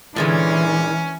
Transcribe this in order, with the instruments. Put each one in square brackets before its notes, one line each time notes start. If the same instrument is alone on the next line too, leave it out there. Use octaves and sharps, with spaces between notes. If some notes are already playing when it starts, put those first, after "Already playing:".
[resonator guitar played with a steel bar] A#2 D3 G#3 [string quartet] E3 [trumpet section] C#4